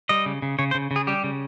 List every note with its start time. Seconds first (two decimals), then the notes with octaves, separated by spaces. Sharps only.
0.09 G3 D#5
0.26 C#3
0.42 C#3
0.59 C#3 C#5
0.71 C5
0.75 C#3
0.91 C#3
0.96 G#4
1.07 G3 G4
1.24 C#3